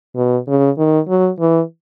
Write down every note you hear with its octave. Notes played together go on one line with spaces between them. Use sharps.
B2
C#3
D#3
F#3
E3